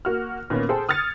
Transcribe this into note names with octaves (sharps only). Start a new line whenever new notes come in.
A#3 F#4 F6
A#2 D#3 A#3 B3 C#4
G#4 A4 C5 G5
D#6 F6 G#6 A6 C#7